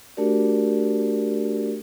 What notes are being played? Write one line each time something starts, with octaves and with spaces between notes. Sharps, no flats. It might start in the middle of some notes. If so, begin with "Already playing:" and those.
A3 D4 F#4 G4 A#4 D5